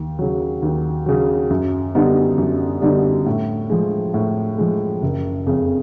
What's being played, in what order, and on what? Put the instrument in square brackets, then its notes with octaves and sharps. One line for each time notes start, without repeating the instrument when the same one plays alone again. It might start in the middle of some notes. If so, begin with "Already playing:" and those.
Already playing: [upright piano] D#2
C#3 F#3
D#2
C#3 F#3
F#2
D3 G3 B3 D#4
F#2
D3 G3 B3 D#4
A2
F3 G#3
A2
F3 G#3
F#1
F2 C#3